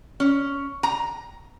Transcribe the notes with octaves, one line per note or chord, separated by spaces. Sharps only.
C#4
A#5